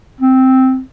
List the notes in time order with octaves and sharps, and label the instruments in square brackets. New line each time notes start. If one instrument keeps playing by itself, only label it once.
[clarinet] C4